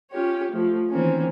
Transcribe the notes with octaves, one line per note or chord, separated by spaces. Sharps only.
C#4 F4 G4 C#5
F3 A3
D#3 E3 A#3 C4 C#4